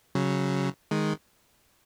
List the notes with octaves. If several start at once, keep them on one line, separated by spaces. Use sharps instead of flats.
C#3 F#3
D#3 G#3